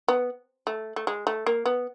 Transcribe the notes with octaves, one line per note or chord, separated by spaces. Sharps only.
B3
A3
A3
G#3
A3
A#3
B3